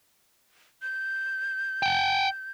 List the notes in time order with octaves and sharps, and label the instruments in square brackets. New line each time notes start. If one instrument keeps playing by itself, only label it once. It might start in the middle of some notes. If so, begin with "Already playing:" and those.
[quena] G6
[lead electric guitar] F#5 G5